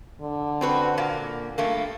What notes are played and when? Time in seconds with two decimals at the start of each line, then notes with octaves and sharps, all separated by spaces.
0.22 D3
0.61 C4 F#4 B4
0.98 A#2 A#3
1.58 G2 A3 A#3